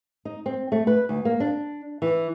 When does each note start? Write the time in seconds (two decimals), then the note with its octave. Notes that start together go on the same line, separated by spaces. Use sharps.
0.25 D#4
0.46 C4
0.72 A3
0.87 B4
1.09 D2
1.25 A#3
1.40 D4
2.02 E3